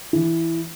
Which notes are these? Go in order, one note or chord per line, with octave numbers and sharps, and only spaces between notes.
E3